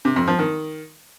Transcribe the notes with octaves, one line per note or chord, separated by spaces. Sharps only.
C3
F2
F3
D#3